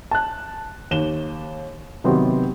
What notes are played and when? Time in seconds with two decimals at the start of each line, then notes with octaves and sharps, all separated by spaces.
0.11 A5 F#6
0.91 D#2 E7 G7
2.04 C3 D#3 F#3 B3 C4 G4